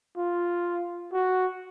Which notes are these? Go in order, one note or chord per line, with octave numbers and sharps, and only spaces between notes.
F4
F#4